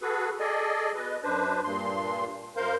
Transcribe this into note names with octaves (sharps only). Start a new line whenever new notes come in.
F#4 G#4 A4 B4
G#4 A4 D5 D#5 G#5
B2 B4 D#5
F#2 D4 B4 C5
G2 A#2 C6
F#2 A#4 C5 F5 C6 G6